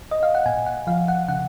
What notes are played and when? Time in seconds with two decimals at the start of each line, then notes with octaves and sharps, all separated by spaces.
0.11 D#5
0.23 F5
0.35 F#5
0.46 A#2 G#5
0.66 F#5
0.87 F3 F5
1.08 F#5
1.28 C#3 F#5